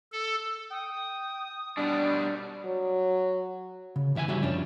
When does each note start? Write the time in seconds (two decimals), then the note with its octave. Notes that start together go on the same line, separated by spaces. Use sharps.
0.12 A4
0.71 G5 D#6
1.78 B2 G3 D4 D5
2.65 F#3
3.96 C#3
4.15 C2 E3 E5 F#5 G#5
4.28 C#3 G3 F#4 E5
4.43 F#2 F3 C#4 D4